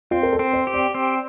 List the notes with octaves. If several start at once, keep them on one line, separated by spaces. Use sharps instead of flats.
C4 F4
A#4
A4
C4
C5
G4
D5
C4